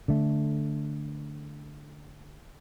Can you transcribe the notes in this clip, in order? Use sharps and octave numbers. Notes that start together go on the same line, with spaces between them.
D3 A3